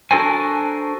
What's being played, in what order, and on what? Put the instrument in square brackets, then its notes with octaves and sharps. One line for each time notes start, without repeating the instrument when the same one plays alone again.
[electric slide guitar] D4 F#4 A4 A#4 C5 G#5